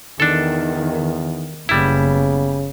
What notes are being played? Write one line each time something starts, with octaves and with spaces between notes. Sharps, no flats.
E2 D#3 D4 A4
F#1 C#3 G3 B3 E4